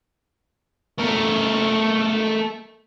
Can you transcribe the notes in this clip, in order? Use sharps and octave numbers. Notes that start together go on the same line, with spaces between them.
A3 A#4